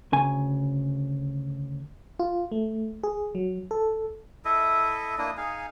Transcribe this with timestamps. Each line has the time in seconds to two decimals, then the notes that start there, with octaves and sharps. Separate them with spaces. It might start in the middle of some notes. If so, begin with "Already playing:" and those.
0.12 D2 C#3 G#5
2.20 F4
2.52 A3
3.04 G#4
3.35 F#3
3.71 A4
4.45 E4 A4 D#5 E5
5.18 A#3 D4 E4 D#5
5.37 D#4 G#4 F5 G#5